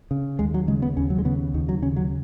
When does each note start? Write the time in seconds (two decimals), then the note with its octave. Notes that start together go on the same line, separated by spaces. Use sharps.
0.11 C#3
0.39 D#2 G#3
0.54 F#3
0.68 C#3 G#3
0.82 B3
0.97 D#2 C#4
1.10 F#3
1.19 G#3
1.25 C#3 B3
1.54 D#2 D#3
1.69 F#3
1.83 C#3 C#4
1.96 F#3